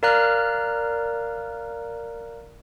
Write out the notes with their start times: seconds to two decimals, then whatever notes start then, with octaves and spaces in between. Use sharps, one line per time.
0.03 A#4 D5 F5 A#5 F6 F#6